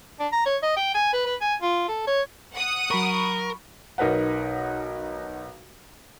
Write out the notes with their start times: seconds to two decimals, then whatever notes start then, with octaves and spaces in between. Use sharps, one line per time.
0.20 D4
0.32 A#5
0.46 C#5
0.63 D#5
0.77 G5
0.95 G#5
1.13 B4
1.26 B4
1.41 G#5
1.62 F4
1.89 A4
2.07 C#5
2.54 F#5 D#6
2.91 F#3 A#4 B5 C#6
3.98 B1 D#4 A#4 B4 F#5